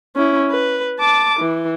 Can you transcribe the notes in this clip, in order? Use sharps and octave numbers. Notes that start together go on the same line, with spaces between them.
C#4 E4
B4
A5 D6
E3